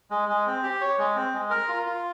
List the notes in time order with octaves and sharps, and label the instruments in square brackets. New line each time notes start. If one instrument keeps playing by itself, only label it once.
[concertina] G#3
G#3
C4
G4
C#5
G#3
C4
G#3
A#4
F4
F4